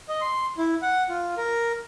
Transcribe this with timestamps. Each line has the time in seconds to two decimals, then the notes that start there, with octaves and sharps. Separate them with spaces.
0.09 D#5
0.21 C6
0.58 E4
0.82 F#5
1.09 F4
1.38 A#4